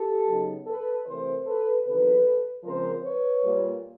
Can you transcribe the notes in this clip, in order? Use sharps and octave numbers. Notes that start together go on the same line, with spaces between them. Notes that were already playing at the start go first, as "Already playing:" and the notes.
Already playing: G4 A4
C#3 F#3 B3 D#4
A4 B4
C3 E3 A3 A#4 C5
A4 B4
E2 C3 D#3 F#3 A4 B4
C#3 F3 G#3 C4 A#4 C5
B4 C#5
A#2 G3 A#3